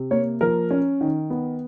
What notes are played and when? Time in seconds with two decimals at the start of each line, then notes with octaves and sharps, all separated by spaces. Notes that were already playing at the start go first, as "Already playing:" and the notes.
Already playing: C3
0.11 A#3 C#5
0.41 F3 A#4
0.71 C#4
1.01 D#3
1.30 B3